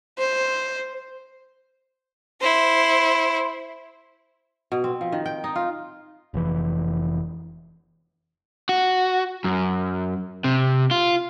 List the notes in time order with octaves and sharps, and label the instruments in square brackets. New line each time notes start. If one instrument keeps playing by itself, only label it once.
[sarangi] C5
[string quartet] E4 C5
[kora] B2
C4
F3
D#3
G5
D#4
F4
[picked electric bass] F1 E3
[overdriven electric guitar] F#4
F#2
C3
F4